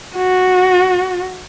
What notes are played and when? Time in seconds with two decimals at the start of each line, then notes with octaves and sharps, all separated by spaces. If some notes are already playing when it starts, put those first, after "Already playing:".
0.16 F#4